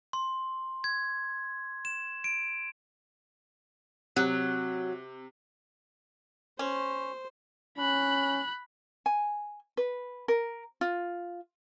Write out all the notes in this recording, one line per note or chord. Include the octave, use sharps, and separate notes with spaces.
C6
G#6
E7
D7
C3 F#3
C#4 C5
C#4 B5 F#6
G#5
B4
A#4
F4